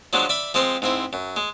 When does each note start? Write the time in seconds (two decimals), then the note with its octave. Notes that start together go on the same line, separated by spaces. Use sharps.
0.13 F3 F#3 G#3 D4
0.29 D5 E5 B5
0.54 F3 G#3 C4 C5
0.82 G#2 C4 E4
1.13 F#2
1.36 G#3